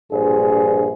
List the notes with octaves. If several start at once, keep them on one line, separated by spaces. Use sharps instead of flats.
A#1 G2 A#2 G#4 C5